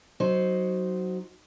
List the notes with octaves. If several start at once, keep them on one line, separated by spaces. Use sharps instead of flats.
F#3 D#4 C5